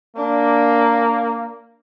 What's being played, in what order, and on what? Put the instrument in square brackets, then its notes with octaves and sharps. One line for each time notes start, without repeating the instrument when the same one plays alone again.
[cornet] A#3 [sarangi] D4